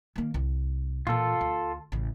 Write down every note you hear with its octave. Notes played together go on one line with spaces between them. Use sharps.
D#3 A#3
C2
A#2 E3 F4 A4
D2
A1 C#3